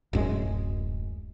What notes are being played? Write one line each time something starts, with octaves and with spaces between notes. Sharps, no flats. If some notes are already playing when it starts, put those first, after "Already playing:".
D1 F#2 G#3